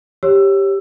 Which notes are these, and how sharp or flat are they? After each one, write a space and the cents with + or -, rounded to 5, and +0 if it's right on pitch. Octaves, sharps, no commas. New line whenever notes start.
G4 +0 C#5 -15 E6 +20